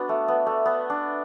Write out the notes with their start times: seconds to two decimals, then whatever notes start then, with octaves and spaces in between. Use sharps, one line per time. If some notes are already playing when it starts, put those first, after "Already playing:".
Already playing: B3 D4 F#4
0.09 A3
0.28 B3
0.46 A3
0.66 B3
0.90 D4